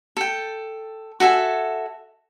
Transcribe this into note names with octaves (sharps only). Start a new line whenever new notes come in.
A4 G5
F#4 A4 E5 G#5